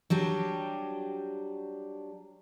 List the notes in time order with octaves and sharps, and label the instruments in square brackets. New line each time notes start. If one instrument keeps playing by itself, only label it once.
[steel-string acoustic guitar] F#3 G3 D4 G4